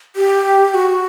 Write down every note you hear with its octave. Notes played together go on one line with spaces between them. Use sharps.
G4
F#4